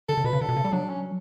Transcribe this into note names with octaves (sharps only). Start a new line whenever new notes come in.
D3 A4
C#3
B2 B4
C#3
D3 A4
B2
C#3
G3
F#3 D4
C#4